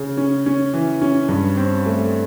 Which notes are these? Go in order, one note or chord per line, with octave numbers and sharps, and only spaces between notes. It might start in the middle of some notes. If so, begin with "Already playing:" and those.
Already playing: C#3
C#4
C#4
E3
C#4
G2
C4
A3